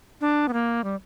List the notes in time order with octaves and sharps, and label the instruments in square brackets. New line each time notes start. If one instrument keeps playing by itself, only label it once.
[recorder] D4
B3
A#3
G3